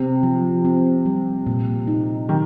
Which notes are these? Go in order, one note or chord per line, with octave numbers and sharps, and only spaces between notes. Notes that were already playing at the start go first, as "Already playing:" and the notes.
Already playing: C3 C4
F3
C4
G3
A#2
D#4
D#3 G4